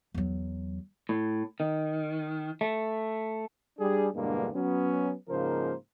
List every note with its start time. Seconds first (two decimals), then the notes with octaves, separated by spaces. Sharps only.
0.14 E2 F#3
1.09 A2
1.60 D#3
2.61 A3
3.79 G3 D4 G#4
4.15 E2 G2 B2 D3 G#3 A#3
4.55 F#3 B3 C#4
5.29 G#2 C#3 F3 A#3 A#4 C5